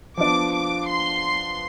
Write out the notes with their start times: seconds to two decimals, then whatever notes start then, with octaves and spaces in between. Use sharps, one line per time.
0.17 F3 B3 D4 D6
0.51 D6
0.86 C6